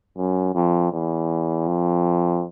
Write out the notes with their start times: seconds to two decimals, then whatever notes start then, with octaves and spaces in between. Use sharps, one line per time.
0.17 F#2
0.55 F2
0.93 E2
1.67 F2